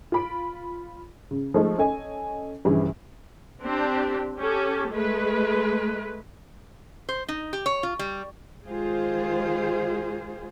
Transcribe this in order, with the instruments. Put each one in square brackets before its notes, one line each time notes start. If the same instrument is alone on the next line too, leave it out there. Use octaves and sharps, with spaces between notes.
[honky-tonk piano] F4 B5 D7
C#3
F3 G#3 A3 D#4
C#4 A4 D#5 G#5
A#1 G2 C#3 E3
[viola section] C4 D4 G4
C#4 G4 A4
G#3 A3 B4
[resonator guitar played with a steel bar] C5
D#4
G4
C#5
F4
G3
[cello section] D#3 G#3 F4 G4 G#4 C5